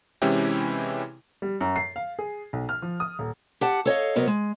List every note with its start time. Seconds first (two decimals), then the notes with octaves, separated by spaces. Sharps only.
0.22 C3 E3 G#3 C#4 E4 G4
1.42 G3
1.61 F#2
1.76 C7
1.96 F5
2.19 G#4
2.53 B1
2.69 F6
2.82 F3
3.00 D#6
3.19 D#1
3.61 G4 F#5 A5
3.86 A4 C#5 D#5 F5
4.16 C3 F#3 B3 A#4 C#5 D#5
4.27 G#3